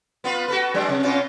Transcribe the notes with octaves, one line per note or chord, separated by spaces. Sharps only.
B3 F4 B4
F#4 A4 B4
F#3 G#3 D4
C3
B2 C#4 F4